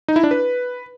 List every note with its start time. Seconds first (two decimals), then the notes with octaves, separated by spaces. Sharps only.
0.08 D#4
0.16 E4
0.23 D4
0.31 B4